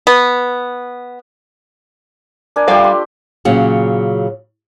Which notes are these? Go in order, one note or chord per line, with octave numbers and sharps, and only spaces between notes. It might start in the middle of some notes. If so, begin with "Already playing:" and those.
B3
D4 A#4 G#5
G3 A3 F4 G4 D5 F5
C6
A#2 C#3 F#3